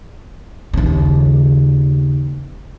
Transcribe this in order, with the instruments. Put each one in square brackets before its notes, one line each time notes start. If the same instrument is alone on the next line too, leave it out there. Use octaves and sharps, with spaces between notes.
[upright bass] D#2 C#3